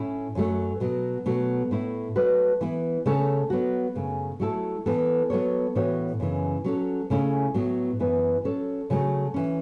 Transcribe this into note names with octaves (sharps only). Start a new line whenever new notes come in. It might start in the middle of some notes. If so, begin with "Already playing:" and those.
Already playing: A2 A3 C#4 E4
F#2 F#3 A3
B2 F#3 B3
B2 F#3 A3 F#4
A2 A3 E4
F#3 A3 F#4 B4
E3 B3 E4
C#3 A3 C#4 A4 C#5
F#3 B3 F#4
F#2 C#3 A3
F#3 A3 E4 A4
E3 B3 A4
F#3 B3 A4 C#5
A2 E3 B3 F#4 C#5
F#2 C#3 E3 C#4
F#3 C#4 A4
C#3 A3 C#4 E4
A2 F#3 B3
F#2 E3 B3 E4 B4
F#3 C#4 A4 C#5
C#3 F#3 A3
E3 C#4